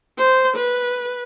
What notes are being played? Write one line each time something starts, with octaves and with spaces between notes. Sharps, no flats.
C5
B4